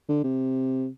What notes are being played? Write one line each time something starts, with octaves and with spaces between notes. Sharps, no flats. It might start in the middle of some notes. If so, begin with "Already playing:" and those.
D3
C3